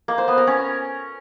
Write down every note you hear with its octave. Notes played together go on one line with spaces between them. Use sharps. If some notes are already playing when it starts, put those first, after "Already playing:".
A#3
C5
B3
A#4
C#4